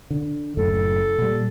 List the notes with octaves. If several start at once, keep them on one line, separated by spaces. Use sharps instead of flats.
D3
F#1 F#2 A2 A4
A#2 G3